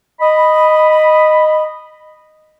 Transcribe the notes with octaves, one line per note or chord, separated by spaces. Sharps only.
D#5 B5